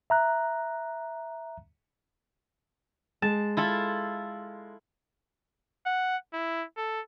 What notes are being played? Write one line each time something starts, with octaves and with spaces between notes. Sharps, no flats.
E5 A#5 F#6
G#3 A5
E4 F4 A4
F#5
E4
A4